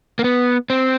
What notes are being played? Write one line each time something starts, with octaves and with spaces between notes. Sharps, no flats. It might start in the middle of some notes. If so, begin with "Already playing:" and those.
A#3
B3
C4